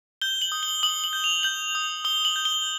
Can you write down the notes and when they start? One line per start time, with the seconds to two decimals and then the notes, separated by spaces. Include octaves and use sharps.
0.22 G6 G7
0.42 F#7
0.52 D#6
0.63 G7
0.83 D#6 F#7
1.04 F#7
1.13 G6
1.24 F7
1.43 G6 F#7
1.75 D#6
2.05 D#6 G7
2.25 F#7
2.36 G6
2.45 G7